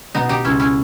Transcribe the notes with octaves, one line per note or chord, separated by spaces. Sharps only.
B2 B3 D#4
D#4 G4
C#2 C#4 E4
C#4 E4